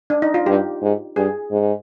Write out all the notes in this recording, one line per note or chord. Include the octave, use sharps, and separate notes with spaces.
D4
D#4
F4
G2 G4
G#2
G2 G#4
G#2